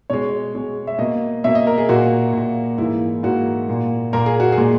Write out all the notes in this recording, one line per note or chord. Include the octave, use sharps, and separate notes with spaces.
B2 G#3 C#5
B2 G#3
E5
B2 A#3 D#5
B2 A#3 E5
D#5
A#4
G#4
A#2 A#3 F#4
A#2 A#3
G#2 E3 A#3 E4
G#2 E3 A#3 F#4
A#2 A#3
A#2 A#3 A#4
G#4
F#4
G#4
A#2 G#3